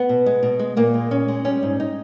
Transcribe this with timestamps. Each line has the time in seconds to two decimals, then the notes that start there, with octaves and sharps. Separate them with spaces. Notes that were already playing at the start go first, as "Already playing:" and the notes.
Already playing: B3
0.09 B2
0.26 G#3
0.43 B2
0.59 G#3
0.77 A#2 A#3
0.94 G#3
1.11 A#2 C#4
1.28 G#3
1.44 G3 C#4
1.63 G#2
1.80 D#4